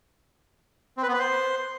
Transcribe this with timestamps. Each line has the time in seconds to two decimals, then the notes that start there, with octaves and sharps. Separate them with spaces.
0.98 C4
1.03 B4
1.08 B3
1.14 B4
1.19 C5